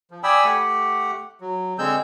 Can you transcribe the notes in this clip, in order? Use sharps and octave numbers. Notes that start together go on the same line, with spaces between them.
F3
D5 G5 G#5 B5 D#6 E6
A3 G4 F#5
F#3
D3 G#3 C4 G#4 E6 G6